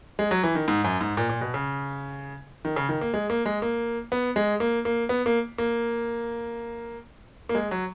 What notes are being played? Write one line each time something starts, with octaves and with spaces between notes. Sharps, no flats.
G#3
F#3
E3
D#3
G#2
F#2
G#2
A#2
A#2
B2
C#3
D#3
C#3
D#3
A#3
G#3
A#3
G#3
A#3
B3
G#3
A#3
A#3
B3
A#3
A#3
A#3
G#3
F#3